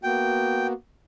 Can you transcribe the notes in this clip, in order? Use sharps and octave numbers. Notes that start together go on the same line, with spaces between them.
A#3 B3 F#4 G5